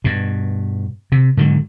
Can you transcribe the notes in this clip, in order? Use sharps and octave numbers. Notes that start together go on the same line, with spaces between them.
G2 B2
C3
G#2 D3 D#3 F#3